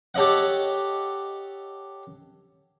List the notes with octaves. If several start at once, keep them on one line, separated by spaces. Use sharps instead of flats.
G4 A4 C#5 D#5 F#5